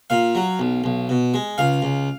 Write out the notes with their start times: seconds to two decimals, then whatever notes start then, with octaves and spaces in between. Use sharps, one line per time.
0.10 A#2 F5
0.35 F#3
0.59 B1
0.84 B1
1.09 B2
1.34 G#3
1.58 C#2 F5
1.82 C#2